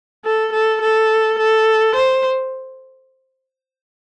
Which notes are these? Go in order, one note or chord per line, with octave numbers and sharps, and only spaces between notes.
A4
A4
A4
A4
C5